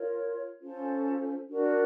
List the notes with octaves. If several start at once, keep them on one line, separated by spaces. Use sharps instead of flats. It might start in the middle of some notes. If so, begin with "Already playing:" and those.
Already playing: F4 A#4 C#5
C#4 F4 A4 C5
D4 F#4 A#4 D5